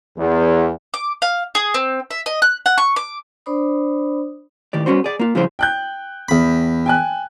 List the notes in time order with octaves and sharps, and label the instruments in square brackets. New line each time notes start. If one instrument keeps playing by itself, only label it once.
[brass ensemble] E2
[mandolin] D6
F5
G#4
C4
E5
D#5
F#6
F#5
C#6
D6
[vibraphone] D4 C5 D5 B5 D#6
[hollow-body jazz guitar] A2 D#3 G4 D5
G3 B3 C#4 F#4 C5
G#4 D5
A#3 F4
C#3 F3 G3 E4 G#4 C5
[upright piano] G5 F#6 G6
[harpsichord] E2 B5
[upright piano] G5 G#5 F#6